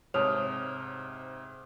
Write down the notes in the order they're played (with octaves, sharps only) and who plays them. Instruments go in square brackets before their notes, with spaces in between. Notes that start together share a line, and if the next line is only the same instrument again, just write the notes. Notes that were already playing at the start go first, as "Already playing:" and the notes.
[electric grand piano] G#2 C3 [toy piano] C#5 A5 [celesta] D#6 F6 F7